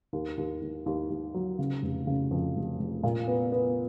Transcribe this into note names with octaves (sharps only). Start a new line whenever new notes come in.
D#2
D#2
D#2
D#2
D#2
F#3
C#3
F1
C#3
F2
F1
F1
A#2
B3
B3